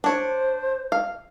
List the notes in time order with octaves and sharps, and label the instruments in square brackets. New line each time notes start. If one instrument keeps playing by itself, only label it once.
[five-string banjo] D4 C#5 [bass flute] C5
[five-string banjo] F5